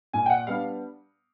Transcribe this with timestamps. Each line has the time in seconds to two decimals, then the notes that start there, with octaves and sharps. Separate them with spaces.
0.13 A#2 G#5
0.26 G5
0.30 F#5
0.47 G3 B3 D4 F5